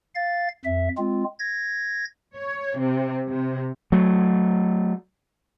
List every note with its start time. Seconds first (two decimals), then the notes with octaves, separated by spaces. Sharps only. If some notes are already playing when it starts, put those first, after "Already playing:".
0.15 F5 A6
0.65 F2 E5
0.98 G#3 C4 F4
1.39 G#6 A#6
2.34 C#5
2.77 C3
3.29 C3
3.92 F#3 A3